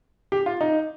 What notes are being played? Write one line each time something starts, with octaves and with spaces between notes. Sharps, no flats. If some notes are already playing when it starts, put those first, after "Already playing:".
G4
F4
D#4